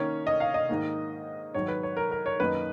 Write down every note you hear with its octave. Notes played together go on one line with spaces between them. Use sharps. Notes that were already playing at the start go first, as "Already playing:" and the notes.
Already playing: D#3 A#3 C#4 C#5
D#5
F5
D#5
G#2 D#3 A#3
G#2 D#3 F#3 C#5
B4
C#5
A#4
A#4
C#5
F#2 D#3 A#3 D#4 B4